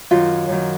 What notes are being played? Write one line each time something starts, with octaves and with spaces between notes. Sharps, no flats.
F#2 D#3 F#3 F4
F#2 D#3 F#3